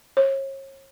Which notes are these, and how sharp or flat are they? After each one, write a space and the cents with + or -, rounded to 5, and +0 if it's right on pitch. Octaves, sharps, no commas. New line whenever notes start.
C#5 -35